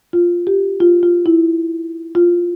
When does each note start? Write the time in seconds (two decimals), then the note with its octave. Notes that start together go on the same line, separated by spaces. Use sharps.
0.13 F4
0.47 G4
0.80 F4
1.03 F4
1.26 E4
2.15 F4